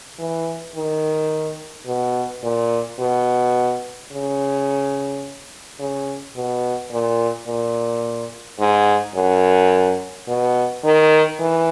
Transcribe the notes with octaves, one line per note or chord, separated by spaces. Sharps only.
E3
D#3
B2
A#2
B2
C#3
C#3
B2
A#2
A#2
G#2
F#2
B2
D#3
E3